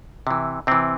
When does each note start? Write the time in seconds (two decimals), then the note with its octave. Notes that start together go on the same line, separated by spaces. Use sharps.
0.27 C3 E3
0.67 C3 E3 C4